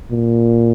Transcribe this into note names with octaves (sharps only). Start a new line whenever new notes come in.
A#2